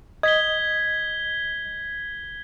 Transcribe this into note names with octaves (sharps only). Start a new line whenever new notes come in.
D#5 G#6 B6 G7